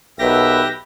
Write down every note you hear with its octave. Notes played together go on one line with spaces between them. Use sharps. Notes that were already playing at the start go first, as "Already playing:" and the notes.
B1 G4 A#4 B4 E5 A#6